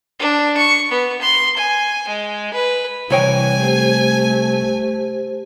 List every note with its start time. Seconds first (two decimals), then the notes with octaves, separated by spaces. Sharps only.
0.19 D4
0.57 C#6
0.91 B3
1.22 C6
1.57 G#5
2.09 G#3
2.54 B4
3.10 C2 E3 C#5 G5 G#5
3.60 A3 G4 C5